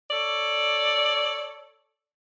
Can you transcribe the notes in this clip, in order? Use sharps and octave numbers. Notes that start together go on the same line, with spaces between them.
A4 C#5 D5